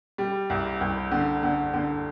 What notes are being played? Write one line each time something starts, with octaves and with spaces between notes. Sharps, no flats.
G3
C2
C2
D3
D3
D3